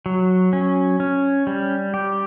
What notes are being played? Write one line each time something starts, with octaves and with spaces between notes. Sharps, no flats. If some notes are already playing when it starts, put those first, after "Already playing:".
F#3
C#4
C#4
G3
G4